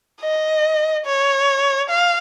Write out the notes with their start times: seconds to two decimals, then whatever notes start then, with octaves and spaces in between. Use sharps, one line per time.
0.21 D#5
1.05 C#5
1.90 F5